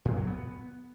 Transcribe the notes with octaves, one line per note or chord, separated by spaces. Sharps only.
A2
F#3
B3